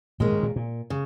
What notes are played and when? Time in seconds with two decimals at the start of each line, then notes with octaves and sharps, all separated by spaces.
0.20 D#2 A#2 D#3 G#3 C#4
0.32 G#2
0.43 A#2
0.56 A#2
0.90 C#3